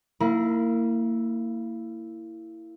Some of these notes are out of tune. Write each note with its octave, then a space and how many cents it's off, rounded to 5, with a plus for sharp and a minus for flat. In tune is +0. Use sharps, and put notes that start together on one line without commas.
A#3 -25 E4 +0 A#5 +45